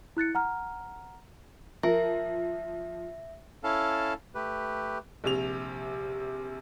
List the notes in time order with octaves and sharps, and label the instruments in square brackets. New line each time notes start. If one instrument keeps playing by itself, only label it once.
[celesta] E4 F#6 A6 C#7
F#5 A#5 F6
[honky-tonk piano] F3 [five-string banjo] A#4 [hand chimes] E5
[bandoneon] C#4 E4 A4 F5 A5
A3 G4 B4
[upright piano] A#1 C3 F7